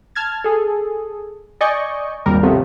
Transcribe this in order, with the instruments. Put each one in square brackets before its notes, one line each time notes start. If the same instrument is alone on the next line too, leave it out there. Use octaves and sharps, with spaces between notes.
[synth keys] A5 F6 G#6 A6
G#4 A4
D5 D#5 G#5 C#6 G6
G#1 D#2 G3 A#4
A2 C3 F3 A3 B3